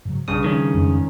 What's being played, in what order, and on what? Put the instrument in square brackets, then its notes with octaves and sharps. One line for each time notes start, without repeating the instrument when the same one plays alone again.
[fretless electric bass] G#2 C#3 F#3
[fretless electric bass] B1 [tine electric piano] G2 C#3 D#6
[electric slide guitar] D#3 C#4 [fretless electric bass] F3
[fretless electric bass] F2 G#3